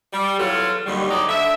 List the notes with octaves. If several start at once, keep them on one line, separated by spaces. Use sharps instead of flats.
G3
E2 F#3 F4 A4 C#5
D#2 D3 F#3 G3
D2 F#3 D#4 D5
D3 E5